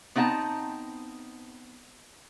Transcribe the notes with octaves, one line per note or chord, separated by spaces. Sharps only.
B3 C4 D#4 E5 A5 A#5